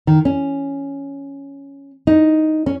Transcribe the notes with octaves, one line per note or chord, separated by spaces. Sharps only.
D#3
C#4
D#4
C#4